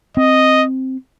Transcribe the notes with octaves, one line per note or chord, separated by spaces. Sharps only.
C4 D#5